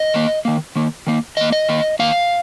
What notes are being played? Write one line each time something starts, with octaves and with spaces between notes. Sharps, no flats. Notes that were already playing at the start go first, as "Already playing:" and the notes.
Already playing: D#5
D#3 A#3
D#3 A#3
D#3 A#3
D#3 A#3
D#3 A#3 D#5
D#5
D#3 A#3
D#3 A#3 F5